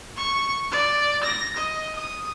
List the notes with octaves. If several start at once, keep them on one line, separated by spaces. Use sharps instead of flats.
C#6
D5
A#6
D#5
D#6